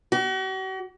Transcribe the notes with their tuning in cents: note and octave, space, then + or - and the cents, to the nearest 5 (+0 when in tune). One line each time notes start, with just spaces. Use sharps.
F#4 +45